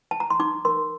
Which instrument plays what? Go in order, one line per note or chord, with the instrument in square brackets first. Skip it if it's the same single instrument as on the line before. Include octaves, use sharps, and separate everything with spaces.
[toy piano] A5
A#5
C6
D#4 D6
A#4 C6